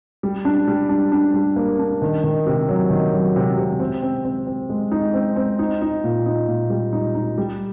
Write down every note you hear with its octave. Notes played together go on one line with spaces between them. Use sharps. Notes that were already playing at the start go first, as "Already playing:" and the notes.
G3
D4
G3
D4
D4
G3
A#3
D4
D#3
D#3
C3
F#3
D#3
F#3
C3
C3
C4
C4
C4
C4
G#3
D#4
C4
C4
D#4
D#4
A#2
D#4
A#2
G3
D#4
D#4
G3